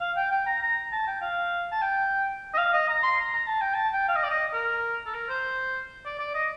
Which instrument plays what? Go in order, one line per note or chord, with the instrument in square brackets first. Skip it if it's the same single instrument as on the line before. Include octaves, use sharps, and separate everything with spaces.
[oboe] F5
G5
G5
A#5
A#5
A5
G5
F5
A5
G5
D#5
F5
D#5
A#5
C6
A#5
A#5
A5
G5
A5
G5
F5
D#5
D5
D#5
A#4
A4
A#4
C5
D5
D5
D#5